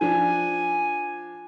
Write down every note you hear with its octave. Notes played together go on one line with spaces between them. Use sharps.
F3 D4 G#5